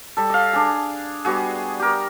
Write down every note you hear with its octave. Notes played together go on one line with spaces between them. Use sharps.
G3 A4
D#5 F5
D4 G#4
G3 B3 F#4 G#4
G4 A#4